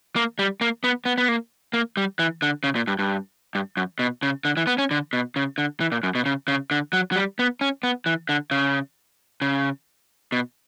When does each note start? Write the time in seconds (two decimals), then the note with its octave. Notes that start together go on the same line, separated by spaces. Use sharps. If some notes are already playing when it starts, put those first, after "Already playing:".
0.16 A#3
0.39 G3
0.61 A#3
0.84 B3
1.05 B3
1.18 B3
1.28 A#3
1.73 A#3
1.97 G3
2.19 E3
2.42 D3
2.64 C#3
2.75 A#2
2.87 G2
2.99 G2
3.55 G2
3.77 F#2
3.99 B2
4.23 C#3
4.45 D3
4.57 E3
4.67 B3
4.78 C#4
4.91 D3
5.13 B2
5.36 C#3
5.58 D3
5.80 E3
5.92 A#2
6.03 F#2
6.15 B2
6.26 C#3
6.48 C#3
6.71 D3
6.93 F#3
7.12 F#3
7.16 G3
7.39 B3
7.61 C#4
7.83 B3
8.06 E3
8.29 D3
8.51 C#3
9.42 C#3
10.32 B2